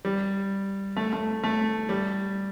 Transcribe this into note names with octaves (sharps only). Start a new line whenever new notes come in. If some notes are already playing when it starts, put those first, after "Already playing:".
G3
A3
A3
A3
G3